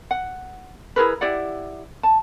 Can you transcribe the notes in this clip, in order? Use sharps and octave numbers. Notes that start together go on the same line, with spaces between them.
F#5
E4 G#4 A#4 B4
E4 G4 D5 F#5
A5